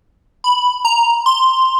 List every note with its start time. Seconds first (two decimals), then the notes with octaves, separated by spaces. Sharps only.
0.44 B5
0.85 A#5
1.26 C6